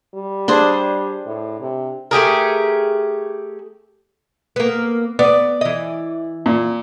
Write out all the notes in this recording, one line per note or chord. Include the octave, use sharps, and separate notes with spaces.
G3
D4 G#4 C5
A2
C3
A3 G4 G#4 A#4
A#3 B3
B3 D5
E3 D#5
A#2